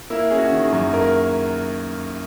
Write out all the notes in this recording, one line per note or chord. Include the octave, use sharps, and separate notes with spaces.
A#3 E4
C#4 G#4
F#4
D#3
G#4
F#2
A#3 A#4